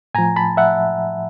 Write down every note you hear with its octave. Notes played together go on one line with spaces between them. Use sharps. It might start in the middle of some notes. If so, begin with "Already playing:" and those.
A2 F3 G#5 A#5
A5 B5
E5 F#5